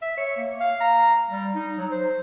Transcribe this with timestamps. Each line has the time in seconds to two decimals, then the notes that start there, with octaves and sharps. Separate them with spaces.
0.02 E5
0.17 C#5
0.37 A#3
0.60 F5
0.80 A#5
1.30 G3
1.55 D#4
1.78 F#3
1.91 C5